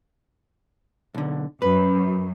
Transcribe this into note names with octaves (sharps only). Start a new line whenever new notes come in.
B1 D3
F#2 B4